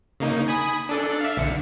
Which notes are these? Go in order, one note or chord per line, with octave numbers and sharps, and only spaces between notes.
C#3 A#3 D#4
G#5 B5 D#6
D4 A4 D5
E5 F5
B1 D3 C#7